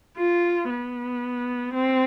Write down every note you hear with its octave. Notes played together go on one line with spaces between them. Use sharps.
F4
B3
C4